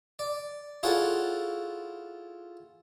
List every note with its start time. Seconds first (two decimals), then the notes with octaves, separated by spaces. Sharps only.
0.19 D5
0.83 E4 F4 G#4 A4 C#5 F#5